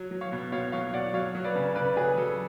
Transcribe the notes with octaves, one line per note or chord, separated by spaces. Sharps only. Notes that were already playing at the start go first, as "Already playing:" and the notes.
Already playing: F#3
F#3
C#5 F5
B2
B2 C#5 F5
F#3 C#5 F5
F#3 D5 F#5
F#3 C#5 F5
F#3
B4 D5
C#3
C#3 B4 D5
F#3 G#4 B4
F#3 A4